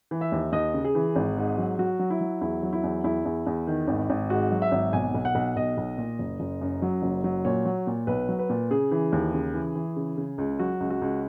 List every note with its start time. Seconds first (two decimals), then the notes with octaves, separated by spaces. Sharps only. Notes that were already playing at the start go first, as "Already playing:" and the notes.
0.11 E3
0.21 E5
0.32 D#2
0.52 D#2 D#5
0.74 C#3
0.84 G#4
0.95 E3
1.16 G#1
1.37 G#2
1.58 F#3
1.79 F#3 F#4
1.99 F#3
2.10 E4
2.21 F#3
2.41 E2 E4
2.63 F#3
2.73 E4
2.84 E2
3.04 E2 E4
3.25 E2
3.46 E2
3.67 D#3
3.88 G#1
4.10 G#1
4.30 G#2 F#4
4.51 F#3
4.62 E5
4.72 G#1
4.93 B1 G#5
5.14 B1
5.25 F#5
5.35 B1
5.56 B1 D#5
5.77 B1
5.98 A#2
6.19 F#1
6.40 F#1
6.61 F#2
6.82 F#3
7.02 F#1
7.24 F#3
7.45 A#2 C#5
7.66 F#3
7.87 A#2
8.07 B1 B4
8.29 F#3
8.39 B4
8.50 A#2
8.71 C#3 G#4
8.91 E3
9.12 D#2
9.33 C#3
9.54 E3
9.75 E3
9.96 C#3
10.17 C#3
10.38 C#2
10.59 F#3 F#4
10.80 C#2
10.90 F#4
11.02 C#2